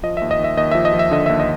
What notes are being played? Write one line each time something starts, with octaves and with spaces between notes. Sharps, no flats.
F3 D#5
D#2 E5
D#5
D#2
E5
D#2 D#5
F3 E5
D#5
F3
E5
D3 D#5
D#2 E5
D#5